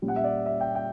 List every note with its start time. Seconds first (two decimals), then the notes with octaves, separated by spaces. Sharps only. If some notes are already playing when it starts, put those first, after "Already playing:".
0.02 A#2 G3 C#4
0.08 F#5
0.16 E5
0.24 D5
0.46 E5
0.60 G5
0.75 G5